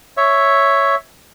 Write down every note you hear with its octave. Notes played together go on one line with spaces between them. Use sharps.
C#5 E5